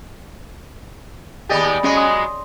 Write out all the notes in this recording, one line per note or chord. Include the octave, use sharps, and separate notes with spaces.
D#2 B3 G4 G#4 D5 D#5
F#3 G#3 B3 C#4 D#5
C6 D#6